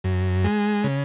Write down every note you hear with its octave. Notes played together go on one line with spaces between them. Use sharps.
F#2
G#3
C#3